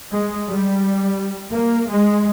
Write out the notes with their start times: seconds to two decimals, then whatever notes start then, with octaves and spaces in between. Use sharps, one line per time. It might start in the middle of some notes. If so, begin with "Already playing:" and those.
0.12 G#3
0.49 G3
1.53 A#3
1.90 G#3